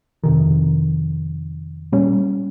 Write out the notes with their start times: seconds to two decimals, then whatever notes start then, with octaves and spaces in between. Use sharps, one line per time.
0.24 F2 C3 D#3
1.92 A#2 G3 C#4